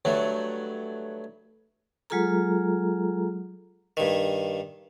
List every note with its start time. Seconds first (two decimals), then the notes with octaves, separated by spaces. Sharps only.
0.05 G2 F#3 A3
2.10 F#3 G#3 F4 G#4 A4 A#5
3.97 G2 D#3